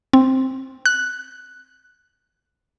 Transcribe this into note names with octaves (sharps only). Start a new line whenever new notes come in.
C4
F#6